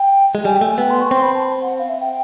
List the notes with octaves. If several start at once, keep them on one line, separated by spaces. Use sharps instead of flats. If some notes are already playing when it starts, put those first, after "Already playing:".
Already playing: G5
G#3
G3 G#5
G5
A3
G#5
B3 G5
C6
C#6
C4 C6
B5
A5
F#5
F5
E5
G5